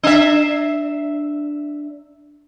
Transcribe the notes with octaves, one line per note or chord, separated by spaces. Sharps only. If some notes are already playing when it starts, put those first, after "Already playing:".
D4 E5